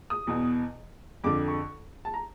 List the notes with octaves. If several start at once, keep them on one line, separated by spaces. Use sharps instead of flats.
D#6
E2 B2
F2 D3 D6
C#6
A5
A#5